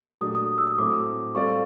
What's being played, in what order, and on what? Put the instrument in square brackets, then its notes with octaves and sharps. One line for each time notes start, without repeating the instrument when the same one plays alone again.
[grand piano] A#2 F#3 A3 D4 G4 [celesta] D#6
[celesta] D#6
E6
D#6
[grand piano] A2 F#3 A3 C4 [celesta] D6
[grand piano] G3 C4 F4 A4 D5 [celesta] C#6